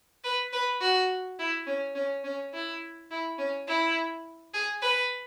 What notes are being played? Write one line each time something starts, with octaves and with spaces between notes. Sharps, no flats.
B4
B4
F#4
E4
C#4
C#4
C#4
E4
E4
C#4
E4
G#4
B4